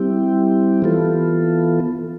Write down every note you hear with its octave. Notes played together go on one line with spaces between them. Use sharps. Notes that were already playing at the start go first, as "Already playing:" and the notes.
Already playing: G3 C4 E4 G4
E3 B3 F4 A4